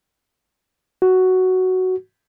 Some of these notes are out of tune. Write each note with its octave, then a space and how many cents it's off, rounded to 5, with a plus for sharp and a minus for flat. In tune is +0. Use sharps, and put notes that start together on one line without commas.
F#4 +5